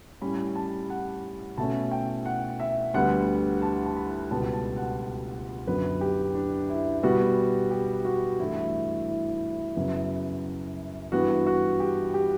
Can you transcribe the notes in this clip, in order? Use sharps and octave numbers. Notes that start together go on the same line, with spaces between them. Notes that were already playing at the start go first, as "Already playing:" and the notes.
A2 G3 C#4 B5
A5
F#5
B2 A3 C#4 A5
G5
F#5
E5
D2 D3 G3 B3 F#5
A5
A5
B5
C#2 B2 G3 B3 A5
A5
F#5
F#2 D3 F#3 B3 B4
G4
D4
E4
B2 G3 B3 F#4
G4
F#4
G2 E3 A3 E4
E4
E4
E4
F#2 C#3 F#3 B3 E4
G2 E3 B3 F#4
F#4
G4
G4